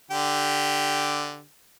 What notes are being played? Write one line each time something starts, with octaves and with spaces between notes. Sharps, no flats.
D3 G4